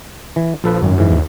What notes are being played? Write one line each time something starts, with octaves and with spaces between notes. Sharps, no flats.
E3
A#1 F3 A4 B4
G#1 F#2
G#2 E3
D#2